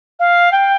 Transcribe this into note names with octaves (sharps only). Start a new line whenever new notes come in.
F5
G5